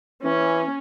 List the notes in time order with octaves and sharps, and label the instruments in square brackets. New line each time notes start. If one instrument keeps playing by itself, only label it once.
[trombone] E3 [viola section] C#4